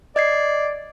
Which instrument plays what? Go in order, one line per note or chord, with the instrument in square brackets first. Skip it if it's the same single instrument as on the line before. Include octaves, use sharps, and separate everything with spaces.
[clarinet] D5 [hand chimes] D#5 G#6 C7